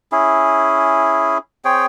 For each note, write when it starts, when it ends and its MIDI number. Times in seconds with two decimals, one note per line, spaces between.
0.12 1.38 61
0.12 1.38 64
0.12 1.38 68
1.65 1.86 60
1.65 1.86 68
1.65 1.86 73
1.65 1.86 79